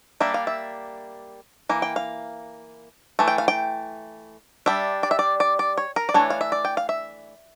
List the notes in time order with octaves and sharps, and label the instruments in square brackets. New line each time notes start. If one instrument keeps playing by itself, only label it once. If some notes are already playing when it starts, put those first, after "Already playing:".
[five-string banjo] G3 A#3 D4 E5
F5
E5
E3 A#3
G5
F5
E3 A3
G5
F5
G5
G3 D4 E5
D5
E5
D5
D5
D5
C#5
A#4
D5
E3 A3 D4 C#5
F5
E5
D5
G5
F5
E5